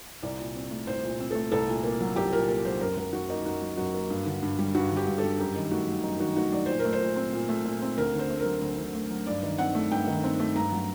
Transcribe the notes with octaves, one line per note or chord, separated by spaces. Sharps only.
C2 D5
A#2
C4
A3
C2 C5
A#2
C4
A3 A4
C2 A4
A#2
A#3
F#3
C2 G4
A#2 A#4
A#3 A#4
F#3 C5
F#2 A#4
F#3 A#4
F#2 F#4
A#3 D#4
F#2 F#4
F#3
F#2 F#4
A#3
G2
D3
G2
G3
G2 F#4
D3
G4
G2
A4
G3
F#2 G4
D#3
A3 F#4
F#3
F#2 D#4
D#3 F#4
A3 F#4
F#3 D5
A#2 C5
A#4
A3
C5
A#2
C4
A#2
A3
A#2
C4
D2 A#4
D3
C5
A3
A#4
F#3
D2
D3
A3
F#3
G2 D5
D#3
C4 F#5
A3
G2 G5
D#3
C4
A3
G2 A#5
F#3